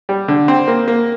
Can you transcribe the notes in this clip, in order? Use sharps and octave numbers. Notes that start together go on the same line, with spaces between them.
G3
D3
C4
A#3
A#3